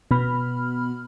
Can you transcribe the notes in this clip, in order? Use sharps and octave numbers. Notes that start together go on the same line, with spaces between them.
B2 B3 B5 F6